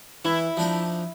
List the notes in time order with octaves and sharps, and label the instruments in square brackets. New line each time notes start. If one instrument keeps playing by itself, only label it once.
[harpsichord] E3 [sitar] E4
[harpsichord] F3 D4 D#4